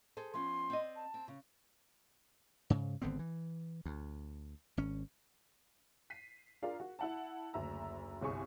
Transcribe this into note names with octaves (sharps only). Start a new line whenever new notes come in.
G#4 A4 C5
F3 B3 C#4 C6
C4 D5 D#5
A5
C4
C#3
G#2 C#3
G#1 D3 B3 C4
E3
D2
G#1 C#4
B6 C7 D#7
D4 F4 G#4 A#4 F5
F#4
E4 F#5 A5
F#1 D2 E5 A#5 E6
G1 C2 G#4 G#5 C#6